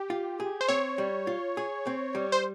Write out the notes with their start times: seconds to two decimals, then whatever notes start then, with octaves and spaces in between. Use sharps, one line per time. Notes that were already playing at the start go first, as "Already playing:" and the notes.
Already playing: G4
0.10 F4
0.40 G#4
0.61 C5
0.68 C4 C#5
0.98 G3
1.27 F4
1.57 G#4
1.87 C4
2.15 G3
2.32 C5